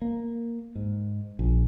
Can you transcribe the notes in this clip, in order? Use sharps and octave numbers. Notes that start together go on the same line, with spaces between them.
A#3
G#2
A#1